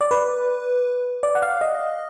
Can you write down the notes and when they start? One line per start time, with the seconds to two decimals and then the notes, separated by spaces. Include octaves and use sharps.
0.01 D5
0.11 B4
1.23 D5
1.35 F#5
1.42 F5
1.61 D#5